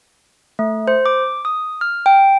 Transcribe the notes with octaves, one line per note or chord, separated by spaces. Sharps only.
A3
C5
D6
D#6
F6
G5